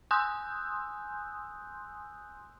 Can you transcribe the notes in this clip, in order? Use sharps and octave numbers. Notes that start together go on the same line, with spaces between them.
G#5 C6 D#6 E6 F#6 G6